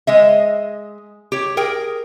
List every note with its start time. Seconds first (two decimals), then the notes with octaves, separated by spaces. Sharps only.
0.07 G#3 D#5 E5
1.32 G4 C#5
1.57 G#4 A#4 G5